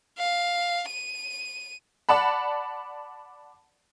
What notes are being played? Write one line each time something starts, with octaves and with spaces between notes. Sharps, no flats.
F5
D#7
D5 F#5 A5 B5